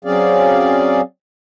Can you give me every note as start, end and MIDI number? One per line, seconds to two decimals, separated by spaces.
0.05 1.01 54
0.05 1.01 60
0.05 1.01 61
0.05 1.01 68
0.05 1.01 74
0.05 1.01 77